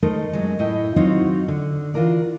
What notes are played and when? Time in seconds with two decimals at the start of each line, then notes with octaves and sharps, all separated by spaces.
0.03 A3 D#4 A#4 C5 D#5
0.33 F#2 F#3 G#3
0.59 A2 E4 C#5 D#5 G5
0.96 F#3 C4 D#4 F4 F#4 C#5
1.48 D3
1.94 E3 F4 F#4 A#4 D5